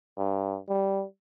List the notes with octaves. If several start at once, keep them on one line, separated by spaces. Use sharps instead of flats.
G2
G3